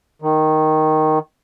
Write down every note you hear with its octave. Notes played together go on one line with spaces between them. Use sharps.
D#3